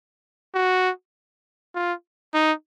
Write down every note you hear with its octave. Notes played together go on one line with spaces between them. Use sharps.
F#4
F4
D#4